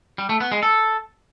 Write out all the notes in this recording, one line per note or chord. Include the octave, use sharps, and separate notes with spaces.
G3
A3
B3
G#3
A4